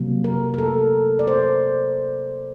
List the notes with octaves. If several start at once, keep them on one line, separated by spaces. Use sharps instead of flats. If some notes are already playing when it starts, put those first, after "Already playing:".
Already playing: C3 F#3 A#3
A#4
A#4
A4
D5
C5